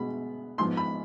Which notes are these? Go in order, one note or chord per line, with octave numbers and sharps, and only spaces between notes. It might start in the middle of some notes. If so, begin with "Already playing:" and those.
Already playing: B2 G#3 B3 B5
G#2 F3 B3 C6
B5